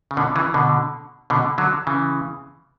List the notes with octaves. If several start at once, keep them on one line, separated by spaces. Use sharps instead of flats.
C#3
B2 D3
C#3 E3
B2 D3
B2 D3
D3 F#3
C#3 E3